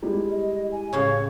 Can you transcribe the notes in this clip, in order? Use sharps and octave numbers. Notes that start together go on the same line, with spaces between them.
G3 G#3 E4
D#5
G#5
A2 C#3 C#5 F5 C#6